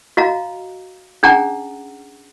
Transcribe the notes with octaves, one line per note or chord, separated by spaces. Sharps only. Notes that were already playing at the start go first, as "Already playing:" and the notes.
F#4 D#5 F5 A#5
C#4 D4 G#4 F#5 G5 A#5